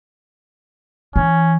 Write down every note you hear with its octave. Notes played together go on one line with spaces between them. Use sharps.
E3 C#4